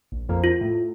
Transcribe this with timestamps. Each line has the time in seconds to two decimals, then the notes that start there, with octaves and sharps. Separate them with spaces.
0.12 A#1
0.29 F2 A#3
0.44 F4
0.61 A2